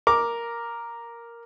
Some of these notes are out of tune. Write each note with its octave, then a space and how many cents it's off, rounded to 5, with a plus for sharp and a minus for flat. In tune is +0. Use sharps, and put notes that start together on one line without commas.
A#4 +0 D6 +0